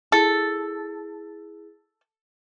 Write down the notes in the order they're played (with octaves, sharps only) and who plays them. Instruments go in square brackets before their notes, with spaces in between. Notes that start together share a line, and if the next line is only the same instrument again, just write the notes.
[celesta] E4 G#4 [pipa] A4